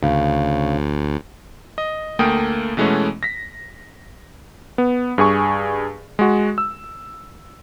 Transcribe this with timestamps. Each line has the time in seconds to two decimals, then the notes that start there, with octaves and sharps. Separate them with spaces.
0.03 D2 C#3
1.78 D#5
2.19 D2 A3 A#3 G5 D#6
2.77 B2 E3 G#3 A3 B3 C#4
3.23 A#6 B6
4.78 B3
5.18 G2 G#4 G#5 C#6
6.19 G#3 F#4
6.58 E6